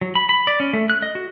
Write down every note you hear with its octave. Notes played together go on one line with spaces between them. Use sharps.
F#3
B5
B5
D5
C#4
A3
F#6
D#5
F#4